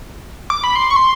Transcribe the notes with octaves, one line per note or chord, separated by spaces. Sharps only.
D6
B5
C6
C#6
C6